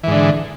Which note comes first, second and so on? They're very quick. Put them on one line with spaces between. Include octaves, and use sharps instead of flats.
E3 G#2 D3